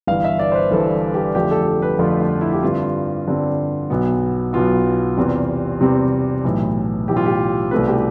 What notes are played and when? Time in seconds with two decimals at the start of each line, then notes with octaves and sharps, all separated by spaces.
0.07 G1 G2 E3 F5
0.24 E5
0.39 D5
0.52 C5
0.55 B4
0.71 G1 G2 E3 A4
1.14 G4
1.35 F2 D3 F3 A3 G4
1.51 A4
1.67 A4
1.82 B4
1.99 F2 D3 F3 A3 F4
2.20 F4
2.41 E4
2.53 G4
2.62 G2 D3 G3 C4 F4
3.27 G2 D3 G3 C4
3.90 B1 B2 B3
4.53 B1 B2 B3 F4
5.17 E2 C3 G3 C4
5.81 E2 C3 G3 C4
6.45 B1 A2 E3
7.08 B1 A2 E3 G4
7.17 F4
7.26 G4
7.71 C2 B2 A3 C4 B4
7.87 G4